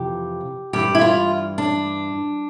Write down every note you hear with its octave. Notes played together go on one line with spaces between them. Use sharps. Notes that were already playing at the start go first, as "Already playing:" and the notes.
Already playing: F2 C3 E3 G4
G2 E3 G4
E4
F4
D4